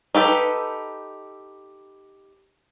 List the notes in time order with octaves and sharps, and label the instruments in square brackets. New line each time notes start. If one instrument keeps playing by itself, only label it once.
[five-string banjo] D#4 G4 A4 B4